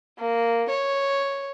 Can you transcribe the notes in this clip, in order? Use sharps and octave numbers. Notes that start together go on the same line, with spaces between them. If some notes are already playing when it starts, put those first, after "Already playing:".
A#3
C#5